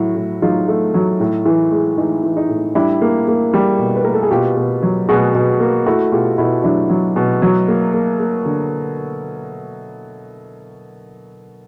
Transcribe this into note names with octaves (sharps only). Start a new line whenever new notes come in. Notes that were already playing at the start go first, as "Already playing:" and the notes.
Already playing: A2 F#3 E4 F#4
A2
F#3 D#4 F4
A3
F#3
A2
E3
G#3
E3 D#4
E3
D#4
A2
G3 D4 E4
A#3
A#3
G3
B2
B4
A#3 A#4
A4
G#4
B2 F4 G4
B2
F#3
B2 F#4 G#4
B2
A#3
A3 E4 F#4
B2 F4 G4
B2 E4 F#4
F#3 D4 E4
F#3
B2
F#3
A#3
A#3
A#3
D3